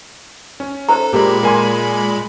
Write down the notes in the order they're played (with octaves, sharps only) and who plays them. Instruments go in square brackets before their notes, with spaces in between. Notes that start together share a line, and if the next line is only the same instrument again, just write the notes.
[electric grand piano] C#4
[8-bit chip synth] A4 [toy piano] C5 A#5
[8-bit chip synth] A#2 G#3 B5 [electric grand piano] A#3 G4
[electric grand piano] A#3 G#5 C6